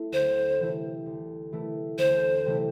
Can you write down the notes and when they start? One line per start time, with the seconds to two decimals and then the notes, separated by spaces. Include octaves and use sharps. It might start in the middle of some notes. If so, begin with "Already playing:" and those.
Already playing: A3 E4
0.12 D2 C5
0.59 C3 E3 A3 E4
1.06 D2
1.52 C3 E3 A3 E4
1.98 D2 C5
2.46 C3 E3 A3 E4